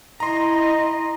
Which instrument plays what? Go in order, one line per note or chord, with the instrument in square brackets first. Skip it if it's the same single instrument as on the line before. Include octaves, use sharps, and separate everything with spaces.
[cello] E4 D#5 [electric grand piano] A#5 C6